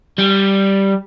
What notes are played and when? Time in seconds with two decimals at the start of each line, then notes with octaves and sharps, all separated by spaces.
0.18 G3